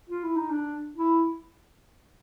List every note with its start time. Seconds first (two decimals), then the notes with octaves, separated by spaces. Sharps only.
0.10 F4
0.23 E4
0.36 D#4
0.50 D4
0.96 E4